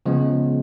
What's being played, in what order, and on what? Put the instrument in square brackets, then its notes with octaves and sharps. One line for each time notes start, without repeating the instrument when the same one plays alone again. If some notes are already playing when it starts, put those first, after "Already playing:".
[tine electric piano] C#3 F3 G#3 B3